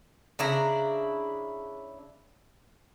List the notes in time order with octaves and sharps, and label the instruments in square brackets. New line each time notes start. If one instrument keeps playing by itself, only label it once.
[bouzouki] C#3 D4 E4 A#5